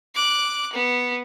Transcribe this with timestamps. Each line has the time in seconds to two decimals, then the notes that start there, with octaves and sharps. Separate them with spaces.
0.15 D6 F#6
0.73 B3